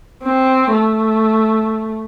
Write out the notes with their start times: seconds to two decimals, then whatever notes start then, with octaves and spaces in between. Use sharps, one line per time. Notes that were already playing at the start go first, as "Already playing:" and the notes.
0.24 C4
0.73 A3